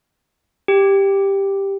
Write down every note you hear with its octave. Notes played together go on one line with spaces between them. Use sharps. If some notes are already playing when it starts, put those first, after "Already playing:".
G4